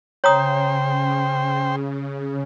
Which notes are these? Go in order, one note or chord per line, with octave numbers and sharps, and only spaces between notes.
C#3 C5 C#5 G5 A#5 D#6